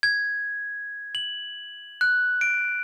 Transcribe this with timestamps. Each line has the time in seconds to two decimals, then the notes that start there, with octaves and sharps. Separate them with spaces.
0.03 G#6
1.15 F#7
2.01 F#6
2.41 D7